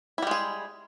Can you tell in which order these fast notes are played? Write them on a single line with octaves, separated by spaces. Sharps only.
E4 G3 G#3 G#4